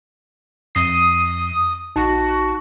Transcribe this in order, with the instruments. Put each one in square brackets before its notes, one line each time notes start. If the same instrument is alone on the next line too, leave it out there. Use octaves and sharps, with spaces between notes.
[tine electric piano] F2 C7 [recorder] D#6
[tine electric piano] A#1 D#4 A5 [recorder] F#4